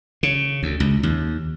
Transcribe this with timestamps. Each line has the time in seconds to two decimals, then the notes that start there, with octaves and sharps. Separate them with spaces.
0.23 C#3
0.63 D2
0.80 C#2
1.03 D#2